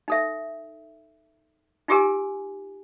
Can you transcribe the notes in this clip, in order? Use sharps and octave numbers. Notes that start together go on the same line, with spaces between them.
D#4 A4 E5
D#4 F4 G4 G#4 A#4 G#5